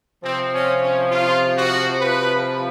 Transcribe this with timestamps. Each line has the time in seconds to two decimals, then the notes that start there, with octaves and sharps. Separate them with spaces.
0.23 C3 F3 C4
0.53 C#4
0.82 C#4
1.11 F4
1.57 F#4
2.01 B4